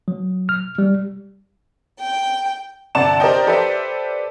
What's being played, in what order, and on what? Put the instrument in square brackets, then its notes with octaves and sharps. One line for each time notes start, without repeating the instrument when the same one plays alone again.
[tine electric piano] F#3
F6
G3
[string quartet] G5
[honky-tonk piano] G1 C3 D5 F#5 A5 E7
G4 A#4 C5 D5 D#5 G5
G4 A4 B4 C5 D5 E5